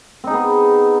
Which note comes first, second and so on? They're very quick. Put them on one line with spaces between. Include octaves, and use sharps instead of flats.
C4 D#4 G#4 B3